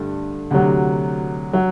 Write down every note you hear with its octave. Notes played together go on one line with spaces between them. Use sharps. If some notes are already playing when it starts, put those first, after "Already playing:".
Already playing: G2 D3 A3
D2 C3 F#3
F#3